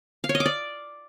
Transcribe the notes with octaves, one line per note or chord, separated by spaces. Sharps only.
F5
C#5
D#5
D6
D5